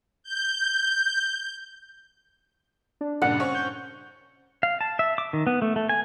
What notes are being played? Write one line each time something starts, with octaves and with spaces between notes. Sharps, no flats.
G6
D4
G2 A#2 C#3 F#5
C4 C#4 C#6
G6
F5
A5
E5
D6
D#3
B3
A3
A3
G#5